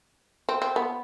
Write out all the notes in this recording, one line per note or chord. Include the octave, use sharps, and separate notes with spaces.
C4
C4
B3